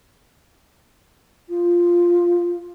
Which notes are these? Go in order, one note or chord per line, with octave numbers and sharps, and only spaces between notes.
F4